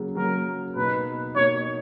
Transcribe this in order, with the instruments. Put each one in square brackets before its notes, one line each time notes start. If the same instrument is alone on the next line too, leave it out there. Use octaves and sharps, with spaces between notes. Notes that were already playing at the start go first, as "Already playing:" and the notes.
Already playing: [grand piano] C#3 F#3 A#3
[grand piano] C#3 F#3 A#3 [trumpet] A#4
[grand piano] B2 A#3 D#4 [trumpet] B4
[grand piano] B2 A#3 D#4 [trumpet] C#5